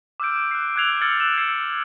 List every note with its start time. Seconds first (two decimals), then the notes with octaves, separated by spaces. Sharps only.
0.20 D6 E6 F6 G6 D7
0.51 F#6 C7
0.76 E6 F#6 G#6 C7 F7 F#7
1.01 E6 F6 G#6 A6 C#7 F#7
1.20 E6 F#6 E7 F#7
1.38 E6 G#6 C7 F7 F#7